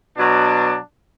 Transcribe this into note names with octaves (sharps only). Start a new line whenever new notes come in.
B2 F#3 D4